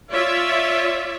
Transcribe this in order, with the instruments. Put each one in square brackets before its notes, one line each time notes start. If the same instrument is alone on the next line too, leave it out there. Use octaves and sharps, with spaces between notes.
[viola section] F4 C#5 D5 E5